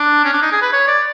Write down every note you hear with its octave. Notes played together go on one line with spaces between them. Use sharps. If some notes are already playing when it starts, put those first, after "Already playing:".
Already playing: D4
C#4
D4
D#4
G#4
B4
C#5
D5